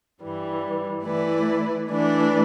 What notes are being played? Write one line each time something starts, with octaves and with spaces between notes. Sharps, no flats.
G2 E3 G3
E3 A3 E4 B4 D5
E3 A3 D4 B4 D5